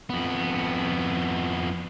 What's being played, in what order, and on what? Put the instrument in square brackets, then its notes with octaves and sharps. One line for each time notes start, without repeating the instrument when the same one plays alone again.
[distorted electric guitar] F2 B3